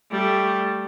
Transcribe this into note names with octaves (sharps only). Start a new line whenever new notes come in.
G3 A3